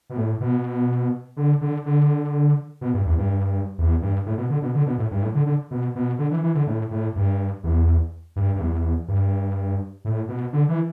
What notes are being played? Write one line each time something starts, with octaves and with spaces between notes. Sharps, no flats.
B2
A2
B2
D3
D3
D3
B2
G2
E2
G2
E2
G2
A2
B2
D3
B2
D3
B2
A2
G2
A2
D3
D3
B2
B2
D3
E3
E3
D3
A2
A2
G2
E2
G2
G2
E2
G2
A2
B2
D3
E3